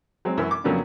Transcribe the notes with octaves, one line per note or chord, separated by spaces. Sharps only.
F#3 G#3 C4
F#2 E3
D6
F2 C#3 F#3 A#3 B3 D4